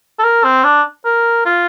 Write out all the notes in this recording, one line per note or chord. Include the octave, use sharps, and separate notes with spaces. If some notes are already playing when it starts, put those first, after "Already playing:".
A4
A#4
C4
D4
A#4
F4